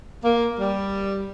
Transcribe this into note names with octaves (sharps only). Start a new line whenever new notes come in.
A#3
G3